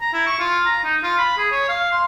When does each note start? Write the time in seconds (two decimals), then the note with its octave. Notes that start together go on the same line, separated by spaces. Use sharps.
0.01 A#5
0.13 E4
0.27 C#6
0.39 F4
0.66 A#5
0.84 D#4
1.03 F4
1.18 B5
1.38 G#4
1.52 C#5
1.69 F5
1.92 C6